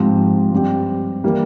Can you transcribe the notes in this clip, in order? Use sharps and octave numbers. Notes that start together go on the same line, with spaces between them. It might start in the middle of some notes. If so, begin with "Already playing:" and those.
Already playing: G#2 F3 C4 G4
G2 G3 C4 G4
E3 G3 A#3